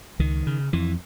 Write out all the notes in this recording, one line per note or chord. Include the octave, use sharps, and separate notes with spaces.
C#2 D#3
C#3
F2 E3